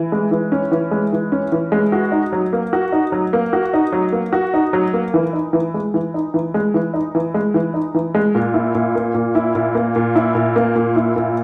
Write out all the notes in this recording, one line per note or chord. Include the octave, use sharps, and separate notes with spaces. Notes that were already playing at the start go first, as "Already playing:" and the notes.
Already playing: E3
G#3
E3
C#4
E3
G#3
E3
C#4
E3
G#3
F#4
D#4
F#3
A#3
F#4
D#4
F#3
A#3
F#4
D#4
F#3
A#3
F#4
D#4
F#3
A#3
E3
D#4
E3
G#3
E3
D#4
E3
G#3
E3
D#4
E3
G#3
E3
D#4
E3
G#3
A#2
E4
A#2
A#3
A#2
E4
A#2
A#3
A#2
E4
A#2
A#3
A#2
E4
A#2